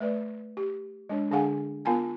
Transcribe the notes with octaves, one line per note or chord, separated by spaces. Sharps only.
A3 B4 D5
G4
G#3 D4 C#5
D3 D4 G#4 F5 F#5 G#5
B3 F4 A#4 G#5 A5